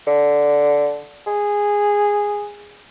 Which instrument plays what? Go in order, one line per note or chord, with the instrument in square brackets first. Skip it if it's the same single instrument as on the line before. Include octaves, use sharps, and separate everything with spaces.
[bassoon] D3
G#4